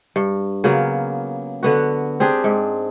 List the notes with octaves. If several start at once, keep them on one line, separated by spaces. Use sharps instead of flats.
G2
C#3 F#3 A#3 B3
D3 B3 F#4
C4 D4 G4 G#4
G#2